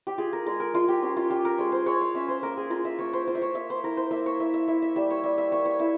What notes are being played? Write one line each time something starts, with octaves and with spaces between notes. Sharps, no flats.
G4
F4 G#4
A#4
G#3 A#4
A#4
G#3 F4
G4
C#4 G4
F4
F4 G4
A#4
G#3 C#5
C5
G#3 C#5
F5
C#4 E5
C5
A#3 A#4
G#4
F4 A#4
E5
A#3 C#5
C5
F4 C5
E5
C#5
A#3 E5
C5
E4 A#4
C5
A#3 E5
C#5
E4 E5
E5
E4 E5
E5
G3 E5
C#5
G3 E5
E5
A#3 C#5
C#5
E4 E5